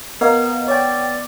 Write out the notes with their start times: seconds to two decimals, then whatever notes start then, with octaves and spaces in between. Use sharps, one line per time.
0.21 B3 A#4 D#5 F5
0.68 C#5 D5 G5